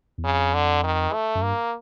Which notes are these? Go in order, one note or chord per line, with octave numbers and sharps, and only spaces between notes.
E2
F2 C#3
D3
D#3
A3
F#2
G2 A#3